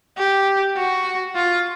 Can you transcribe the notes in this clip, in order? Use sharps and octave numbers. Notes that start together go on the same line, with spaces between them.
G4
F#4
F4